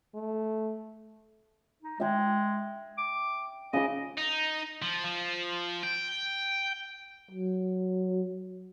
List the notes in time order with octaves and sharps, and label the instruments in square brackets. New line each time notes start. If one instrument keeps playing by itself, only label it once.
[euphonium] A3
[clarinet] D#4
[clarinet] G#3 [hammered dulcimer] E5 G5
[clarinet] D6
[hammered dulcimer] C#3 C6 D6 [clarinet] D#5
[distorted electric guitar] D#4
F3
F3
G5
[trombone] F#3